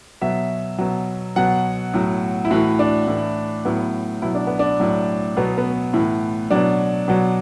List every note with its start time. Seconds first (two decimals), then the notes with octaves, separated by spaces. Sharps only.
0.21 B2 F#3 E5
0.78 B2 F#3
1.36 B2 F#3 F#5
1.94 A2 F#3
2.45 E4
2.51 A2 E3 F#4
2.79 D4
3.07 A2 E3
3.65 A2 F#3 B3
4.22 B2 F#3 E4
4.35 D4
4.47 B3
4.59 D4
4.80 A2 F#3
5.37 B2 F#3 B3
5.58 B3
5.93 A2 E3
6.51 B2 F#3 D4
7.08 B2 F#3